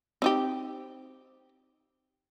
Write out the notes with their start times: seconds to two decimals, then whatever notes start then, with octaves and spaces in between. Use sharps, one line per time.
0.22 C4 D#4 G4